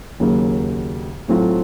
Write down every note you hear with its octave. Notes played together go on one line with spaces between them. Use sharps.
D#2 C#3 F#3 A#3
A2 F#3 C4 F4 A4